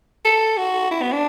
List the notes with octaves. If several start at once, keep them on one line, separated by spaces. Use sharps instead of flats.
A4
F#4
E4
B3
D4